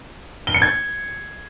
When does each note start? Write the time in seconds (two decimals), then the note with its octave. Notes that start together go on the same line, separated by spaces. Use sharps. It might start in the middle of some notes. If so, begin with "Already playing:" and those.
0.47 G7
0.54 C#7
0.62 G#6